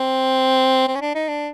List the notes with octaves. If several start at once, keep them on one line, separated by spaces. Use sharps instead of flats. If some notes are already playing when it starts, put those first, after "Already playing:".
Already playing: C4
C4
C#4
D4
D#4
D4